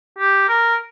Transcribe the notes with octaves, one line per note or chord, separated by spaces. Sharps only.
G4
A#4